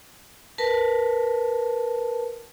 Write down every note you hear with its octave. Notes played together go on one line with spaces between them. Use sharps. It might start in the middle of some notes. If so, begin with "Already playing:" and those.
A#4 B4 A5